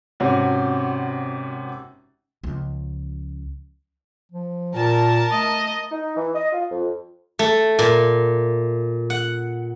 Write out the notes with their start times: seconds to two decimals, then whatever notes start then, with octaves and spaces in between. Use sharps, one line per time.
0.20 G#1 C3 C#4 F#4
2.44 C#2 F3
4.32 F3
4.74 A#2 A#4 A5
5.31 A3 D#5
5.92 D#4
6.16 E3
6.35 D#5
6.52 F4
6.71 F2
7.39 A3
7.79 A#2
9.10 F#5